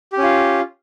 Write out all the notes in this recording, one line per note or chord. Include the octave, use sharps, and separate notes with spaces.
C#4 F4 G4